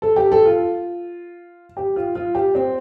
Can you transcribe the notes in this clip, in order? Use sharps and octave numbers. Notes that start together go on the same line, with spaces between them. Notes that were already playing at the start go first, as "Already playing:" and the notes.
A4
G4
A4
F4
G4
F4
F4
G4
C4